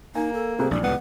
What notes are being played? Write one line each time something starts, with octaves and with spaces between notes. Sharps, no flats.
A#3 D#4 G#5
A4
C2 C3 A3 G#4
A#1 G#2 E3 G3 D4
C#2 A2 B3 F#5